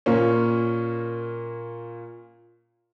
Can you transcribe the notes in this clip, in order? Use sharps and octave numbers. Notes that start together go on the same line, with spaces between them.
A#2 A#3 C#4